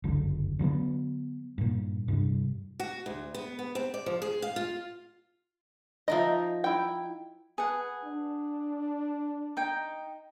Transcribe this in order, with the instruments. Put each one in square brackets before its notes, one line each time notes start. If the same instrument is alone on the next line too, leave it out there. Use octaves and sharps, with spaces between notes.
[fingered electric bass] G1 C#2 F#2 D3
D3 F#3 A#3 B3
G2 A#2
G2 C3 G3
[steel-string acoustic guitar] F#4
D2
B3
B3
C4
D5
F3
G#4
F5
F4
[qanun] F3 D#4 A#4 [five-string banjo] D#5 E5
[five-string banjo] E4 G5
[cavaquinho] G#4 F#5 [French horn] B4
[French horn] D4
[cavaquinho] D#4 G5